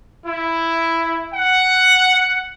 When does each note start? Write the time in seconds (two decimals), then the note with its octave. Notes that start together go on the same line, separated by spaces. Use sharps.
0.25 E4
1.34 F#5